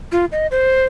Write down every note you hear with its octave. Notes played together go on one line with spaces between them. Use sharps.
F4
D#5
C5